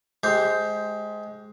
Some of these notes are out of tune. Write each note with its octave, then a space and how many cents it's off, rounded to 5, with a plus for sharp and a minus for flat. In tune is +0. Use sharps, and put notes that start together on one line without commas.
G#3 +20 G4 +0 C5 +0